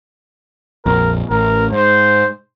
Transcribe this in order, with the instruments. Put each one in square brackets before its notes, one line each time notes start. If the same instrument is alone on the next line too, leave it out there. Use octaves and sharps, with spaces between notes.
[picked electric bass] A#1 F2 [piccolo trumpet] A#4
[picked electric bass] A1 [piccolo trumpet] A#4
[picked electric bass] G#2 [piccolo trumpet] C5